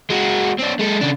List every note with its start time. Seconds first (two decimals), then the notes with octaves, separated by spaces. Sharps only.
0.10 G#3 F#4
0.58 C4 D4
0.79 G#3 A4
1.01 C#3 D4